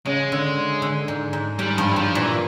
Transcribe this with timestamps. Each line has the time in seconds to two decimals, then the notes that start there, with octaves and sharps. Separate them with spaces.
0.06 C#3 G#3
0.32 D3
0.82 D3
1.08 G#2
1.33 G#2
1.59 G#2 G3
1.78 G2 F3
1.92 E3
1.96 G#2 F3
2.15 A#2 E3